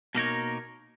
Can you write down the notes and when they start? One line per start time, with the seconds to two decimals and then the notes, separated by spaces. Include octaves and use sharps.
0.15 B2 A#3 D#4 A#4 C#5